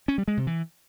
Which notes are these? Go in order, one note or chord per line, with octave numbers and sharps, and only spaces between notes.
C#4
G3
G#3
C3
E3